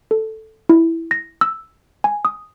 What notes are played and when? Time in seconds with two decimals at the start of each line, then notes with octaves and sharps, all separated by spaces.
0.11 A4
0.69 E4
1.11 A#6
1.41 E6
2.04 G#5
2.25 D#6